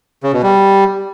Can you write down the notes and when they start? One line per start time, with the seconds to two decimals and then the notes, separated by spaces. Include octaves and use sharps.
0.23 C#3
0.33 B2
0.43 G3